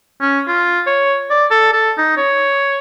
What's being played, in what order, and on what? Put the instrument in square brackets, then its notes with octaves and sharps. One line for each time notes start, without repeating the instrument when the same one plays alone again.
[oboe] C#4
F4
C#5
D5
A4
A4
D#4
C#5